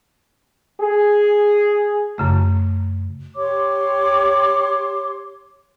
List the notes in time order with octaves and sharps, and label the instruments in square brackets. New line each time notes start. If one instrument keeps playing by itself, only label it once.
[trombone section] G#4
[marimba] F#2 C#3 A3
[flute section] G4 C#5 C6 D6